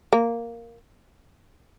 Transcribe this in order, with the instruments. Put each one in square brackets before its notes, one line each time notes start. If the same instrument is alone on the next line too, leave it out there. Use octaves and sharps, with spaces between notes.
[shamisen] A#3